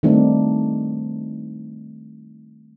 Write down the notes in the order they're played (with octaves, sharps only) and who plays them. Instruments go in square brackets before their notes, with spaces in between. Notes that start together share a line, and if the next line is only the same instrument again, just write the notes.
[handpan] D#3 G3 A3 C4 D4 D#4